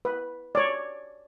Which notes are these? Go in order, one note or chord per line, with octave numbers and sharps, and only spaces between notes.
B4
C#5 D5